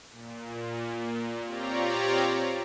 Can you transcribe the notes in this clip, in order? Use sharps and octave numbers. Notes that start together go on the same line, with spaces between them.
A#2
C4 F4 G4 C#5 D5 A#5